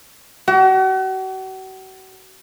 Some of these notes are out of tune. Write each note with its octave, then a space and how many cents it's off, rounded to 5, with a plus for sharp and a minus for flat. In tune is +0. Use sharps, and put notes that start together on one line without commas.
F#4 +40